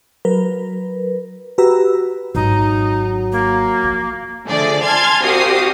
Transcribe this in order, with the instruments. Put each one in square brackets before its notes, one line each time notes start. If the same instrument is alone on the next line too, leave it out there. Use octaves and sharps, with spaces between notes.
[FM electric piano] F#3 A#4 B4
F#4 G4 B4 A#5 E6
[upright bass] G#1 [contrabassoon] F#3 [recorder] D#4
[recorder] A#3
[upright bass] F3
[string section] D3 F3 A3 G#4 D5
G#5 A5 C6 F6 G#6 A6
C2 F#4 G4 F5 D#6 C7